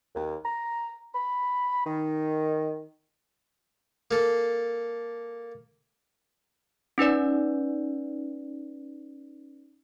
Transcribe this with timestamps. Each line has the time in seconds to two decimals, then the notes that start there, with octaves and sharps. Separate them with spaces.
0.15 D#2
0.45 A#5
1.14 B5
1.86 D#3
4.11 A#3 A4
6.98 C#4 D#4 B4 D5